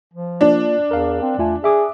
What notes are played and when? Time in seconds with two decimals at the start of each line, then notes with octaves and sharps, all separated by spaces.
0.14 F3
0.41 A#3 D4 F4 A5
0.91 E2 A#4 D5 F5
1.22 C4
1.38 E2 A3 F4 G#5
1.64 G#4 E5 D6 D#6